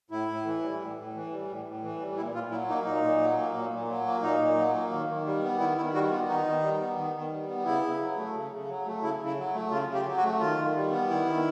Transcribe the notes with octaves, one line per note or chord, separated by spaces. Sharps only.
A2 E4
A2
E3
G3
A2
A2
E3
G3
A2
A2
E3
G3
A#2 E4
A#2 F4
F#3 E4
A#3 D#4
A#2 D#4
A#2
F#3
A#3
A#2
A#2
F#3
A#3
A#2 D#4
A#2
F#3
A#3
D#3
D#3
G3
B3
D#3 E4
D#3 E4
G3 F#4
B3 F4
D#3 D#4
D#3
G3
B3
D#3
D#3
G3
B3
C#3 E4
C#3
F#3
A3
C#3
C#3
F#3
A3
C#3 E4
C#3
E4
F#3
A3
C#3 F4
C#3
G4
F#3
F#4
A3
D#3 F4
D#3
G3
B3
D#3 E4
D#3